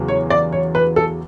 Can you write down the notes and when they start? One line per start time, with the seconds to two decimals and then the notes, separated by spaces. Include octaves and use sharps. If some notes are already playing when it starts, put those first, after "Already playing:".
Already playing: E2 C#3 F#3
0.08 C#5
0.30 D5
0.53 C#5
0.75 B4
0.96 A4